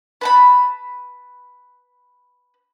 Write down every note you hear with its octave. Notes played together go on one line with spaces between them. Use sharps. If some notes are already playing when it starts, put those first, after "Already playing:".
B4 A5 B5